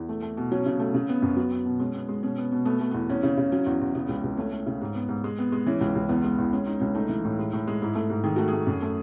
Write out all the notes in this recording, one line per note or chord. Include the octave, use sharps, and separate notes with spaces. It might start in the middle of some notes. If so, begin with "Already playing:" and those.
Already playing: E2
A3
A3
B2
F#3 C#4
C#3
A3
C#3
B3
F#2
F#3 B3
B3
B2
G#3 C#4
B3
G#3
B2 C#4
B3
B2
A3 B3
A3
E2 B3
E2 C#4
C#3
C#3
F#3 C#4
E2
E2
C#3 B3
C#2
C#2
A3 C#4
A3
C#3
G#2
B3
G#2
G#3
B3
G#3
E3 C#4
C#2
C#2
E2 B3
G#3
E2
G#3 C#4
G#3 D#4
C#2 C#4
A3 D#4
E3
A2
G#3
A2
G#3
G#2 E4
A3
G#2
D#3 G#4
A3 F#4
A3 G#4
F#2
A3